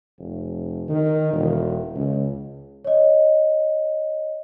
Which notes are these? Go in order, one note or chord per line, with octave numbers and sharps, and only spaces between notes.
F1
D#3
E1
C#2
C#5 D#5